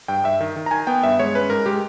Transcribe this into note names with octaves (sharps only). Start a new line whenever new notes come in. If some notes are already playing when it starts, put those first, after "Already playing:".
G2 G5
G2 E5
D#3
D#3
A#5
D#3 G#5
B3 G5
G2 E5
G#3 C#5
C#4 B4
G#2 A#4
G#3 G4